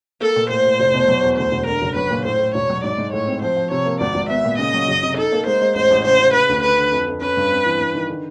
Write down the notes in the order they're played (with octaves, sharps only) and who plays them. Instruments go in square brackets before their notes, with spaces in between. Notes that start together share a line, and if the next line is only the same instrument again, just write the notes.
[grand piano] A#3 [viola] A4
[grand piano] A#2
[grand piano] A2 [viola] C5
[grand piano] A2
F1
B2
F#3
E2
[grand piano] D2 [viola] C5
[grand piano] E1
[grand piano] D3 [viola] A#4
[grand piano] F#1
[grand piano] F#3 [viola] B4
[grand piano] A#2
[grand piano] A2 [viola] C5
[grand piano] A2
[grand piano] E1 [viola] C#5
[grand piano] F#3
[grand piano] G#2 [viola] D5
[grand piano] G#2
[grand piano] A2 [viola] C#5
[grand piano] C4
[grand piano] F3 [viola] C5
[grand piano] F3
[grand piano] C3 [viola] C#5
[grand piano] A#3
[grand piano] G#1 [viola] D5
[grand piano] G#1
[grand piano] B3 [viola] E5
[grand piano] A#2
[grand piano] C#3 [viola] D#5
[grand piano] F#3
F#1
C3
[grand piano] D#4 [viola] A4
[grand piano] A#3
[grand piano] G#3 [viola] C5
[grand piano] G#3
[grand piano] A1 [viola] C5
[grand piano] A1
[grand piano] C#3 [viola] C5
[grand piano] C#3
[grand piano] C#3 [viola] B4
[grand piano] D2
[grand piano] D3 [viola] B4
[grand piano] D3
F2
F2
[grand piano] C#4 [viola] B4
[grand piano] G2
C4
E3
G2
D#3
D3